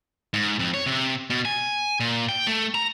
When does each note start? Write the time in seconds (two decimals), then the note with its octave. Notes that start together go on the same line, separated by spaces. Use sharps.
0.34 G#2
0.59 F2
0.74 C#5
0.86 C3
1.30 B2
1.45 G#5
2.00 A#2
2.29 G5
2.47 A3
2.75 A#5